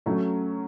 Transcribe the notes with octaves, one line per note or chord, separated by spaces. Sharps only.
F#3 A3 C#4